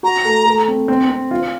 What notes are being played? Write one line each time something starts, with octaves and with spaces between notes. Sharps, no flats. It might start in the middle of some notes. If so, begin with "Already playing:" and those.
F#4 A#5
A3
A3
C4
C4
C4
F4